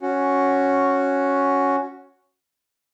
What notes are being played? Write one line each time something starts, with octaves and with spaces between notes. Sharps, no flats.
C#4 F#4